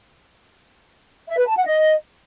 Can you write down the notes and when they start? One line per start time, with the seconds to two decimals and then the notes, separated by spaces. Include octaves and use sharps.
1.28 E5
1.37 B4
1.47 A5
1.56 F#5
1.66 D#5